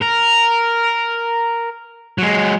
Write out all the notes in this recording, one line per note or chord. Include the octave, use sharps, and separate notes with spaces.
A#4
F#3 G#3